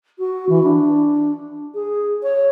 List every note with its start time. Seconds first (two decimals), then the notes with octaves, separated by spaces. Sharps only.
0.19 F#4
0.49 E3
0.63 D4
1.75 G#4
2.23 C#5